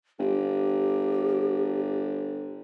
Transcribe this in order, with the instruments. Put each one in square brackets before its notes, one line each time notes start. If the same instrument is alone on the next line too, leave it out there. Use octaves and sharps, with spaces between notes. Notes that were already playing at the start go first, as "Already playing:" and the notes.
[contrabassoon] G1 [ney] G4